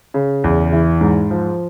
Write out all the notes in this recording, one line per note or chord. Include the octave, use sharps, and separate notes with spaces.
C#3
E2
E3
G#2
F3